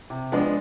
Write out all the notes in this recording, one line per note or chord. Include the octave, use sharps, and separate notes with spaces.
C3
F3 G#3 B3 D4